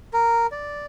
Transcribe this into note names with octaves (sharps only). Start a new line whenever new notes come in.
A#4
D5